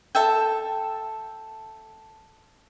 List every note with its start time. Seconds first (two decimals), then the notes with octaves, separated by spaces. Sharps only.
0.15 A4 E5 G5